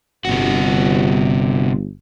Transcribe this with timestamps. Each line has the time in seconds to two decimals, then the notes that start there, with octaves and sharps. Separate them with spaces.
0.25 G1 C3 F#4